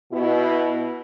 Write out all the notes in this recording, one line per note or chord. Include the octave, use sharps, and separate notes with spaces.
B2 E4